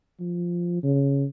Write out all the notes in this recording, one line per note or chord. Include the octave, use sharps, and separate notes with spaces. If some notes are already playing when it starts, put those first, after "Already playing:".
F3
C#3